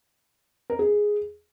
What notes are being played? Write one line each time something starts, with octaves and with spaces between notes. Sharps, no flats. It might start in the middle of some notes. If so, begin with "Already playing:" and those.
A#4
G#4